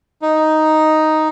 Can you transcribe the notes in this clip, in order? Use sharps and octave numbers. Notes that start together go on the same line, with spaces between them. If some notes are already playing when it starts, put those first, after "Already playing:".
D#4